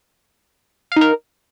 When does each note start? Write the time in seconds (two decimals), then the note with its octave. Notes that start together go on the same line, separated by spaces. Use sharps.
0.92 F5
0.96 D#4
1.01 A#4